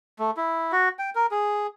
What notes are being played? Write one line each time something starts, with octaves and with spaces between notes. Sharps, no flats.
A3
E4
F#4
G5
A#4
G#4